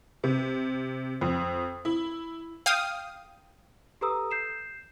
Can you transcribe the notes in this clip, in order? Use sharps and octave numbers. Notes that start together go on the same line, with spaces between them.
C3
F2
E4
F5 G5 D#6
G4 A4 B4 A#5 D#6 E6
G6 C7 E7